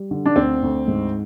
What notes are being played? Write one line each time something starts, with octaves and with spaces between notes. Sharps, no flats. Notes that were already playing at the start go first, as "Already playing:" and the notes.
Already playing: G3
D3
D4
D2 C4
D2
G#2